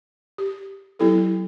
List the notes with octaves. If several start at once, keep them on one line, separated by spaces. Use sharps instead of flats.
G4
F#3 B3 E4 G4 A4